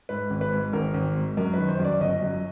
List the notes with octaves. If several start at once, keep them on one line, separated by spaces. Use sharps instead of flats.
G#2 B4
G#1
B4
G#2
G#1 A#4
G#1
G#2
F#2 A#4
D#3 B4
C5
F#2
D5
G1 D#5
F#2